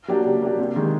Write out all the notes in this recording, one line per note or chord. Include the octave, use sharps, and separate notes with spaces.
F#3 A#3 D4 G4
C#3
F#3 A#3 D4 G4
C3
D#3 G#3